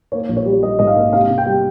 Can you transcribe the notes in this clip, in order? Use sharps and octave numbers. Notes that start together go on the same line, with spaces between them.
A#3 C#5
A#1
C#5
G3
G3 D#5
G#2 D#5
F5
A#3
C3 F5
C3
G5
G3